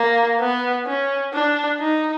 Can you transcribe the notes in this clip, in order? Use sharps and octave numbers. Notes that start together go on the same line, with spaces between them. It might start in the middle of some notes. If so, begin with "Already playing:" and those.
Already playing: A#3
B3
C#4
D4
D#4